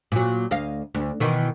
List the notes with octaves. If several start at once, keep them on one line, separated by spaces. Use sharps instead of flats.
A#2 F#3
D2 D#5 F5
D2
B2 D#3 E3